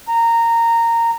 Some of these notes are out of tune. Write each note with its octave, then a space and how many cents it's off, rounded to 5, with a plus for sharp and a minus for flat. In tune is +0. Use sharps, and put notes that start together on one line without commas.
A#5 -15